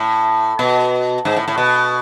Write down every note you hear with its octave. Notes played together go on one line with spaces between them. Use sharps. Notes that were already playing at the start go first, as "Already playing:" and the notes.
Already playing: A2
B2
G#2
A2
A2
B2